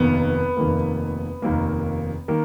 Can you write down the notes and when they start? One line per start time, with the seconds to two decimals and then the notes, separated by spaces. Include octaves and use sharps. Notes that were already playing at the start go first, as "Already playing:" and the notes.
Already playing: F1 D#2 D#3 A#3 B3
0.57 F1 D#2 D#3 A#3
1.42 F1 D#2 D#3 A#3
2.28 D#3 A#3